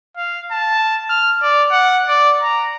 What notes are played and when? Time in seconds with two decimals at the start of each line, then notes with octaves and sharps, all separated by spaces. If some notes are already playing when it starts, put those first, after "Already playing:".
0.17 F5
0.51 A5
1.10 F6
1.42 D5
1.71 F#5
2.08 D5
2.42 A#5